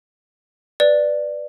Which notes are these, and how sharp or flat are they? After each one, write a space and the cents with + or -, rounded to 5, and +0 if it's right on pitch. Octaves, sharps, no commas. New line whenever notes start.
B4 +0 D5 +10